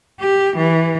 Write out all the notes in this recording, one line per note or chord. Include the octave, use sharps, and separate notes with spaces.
G4
E3